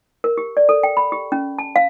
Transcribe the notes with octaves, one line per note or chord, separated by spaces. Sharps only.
A#4
G4
D5
A4
G5
B5
G4
C#4
A5
F5